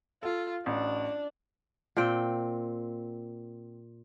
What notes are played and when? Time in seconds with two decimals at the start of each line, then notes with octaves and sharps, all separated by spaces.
0.23 F4 A4
0.66 A1 D4
1.97 A#2 C4 G5